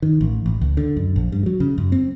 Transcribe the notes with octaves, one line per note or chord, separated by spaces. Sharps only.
D#3
A1
A1
C#2
D3
F#2
A#1
G2
F#3
C#3
F#2
C4